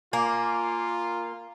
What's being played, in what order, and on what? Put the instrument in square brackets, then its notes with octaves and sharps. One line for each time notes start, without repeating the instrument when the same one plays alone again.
[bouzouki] A#3 [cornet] F4 [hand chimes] G#5 D6